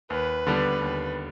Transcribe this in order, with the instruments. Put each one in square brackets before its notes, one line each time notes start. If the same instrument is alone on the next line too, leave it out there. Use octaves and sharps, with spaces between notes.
[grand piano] D#2 [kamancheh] B4
[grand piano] D3 G3 B3 D4
D#2